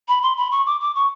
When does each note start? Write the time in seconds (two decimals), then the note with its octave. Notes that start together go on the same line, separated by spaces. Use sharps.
0.08 B5
0.22 C6
0.37 B5
0.51 C#6
0.66 D6
0.81 D6
0.95 C#6